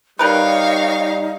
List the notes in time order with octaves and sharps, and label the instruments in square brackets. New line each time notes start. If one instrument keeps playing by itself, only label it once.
[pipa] D#3 A#4 B4 [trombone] G3 [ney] D#4 [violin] C#5 F5